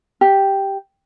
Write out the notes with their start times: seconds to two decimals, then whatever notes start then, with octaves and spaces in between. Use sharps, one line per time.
0.21 G4